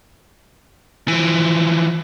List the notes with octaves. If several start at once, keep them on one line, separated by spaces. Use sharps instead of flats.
E3 F3